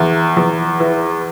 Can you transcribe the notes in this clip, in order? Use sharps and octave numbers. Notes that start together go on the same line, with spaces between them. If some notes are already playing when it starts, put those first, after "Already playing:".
Already playing: E2
E2
E3